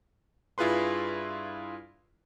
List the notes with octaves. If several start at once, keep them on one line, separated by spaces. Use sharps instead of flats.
G2 E4 F4 G#4 B4 C6